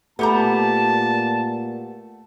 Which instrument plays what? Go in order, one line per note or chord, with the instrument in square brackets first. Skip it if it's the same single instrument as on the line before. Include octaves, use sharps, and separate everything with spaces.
[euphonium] A#2 [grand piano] A3 [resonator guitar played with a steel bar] B3 G4 A#5 [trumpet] A5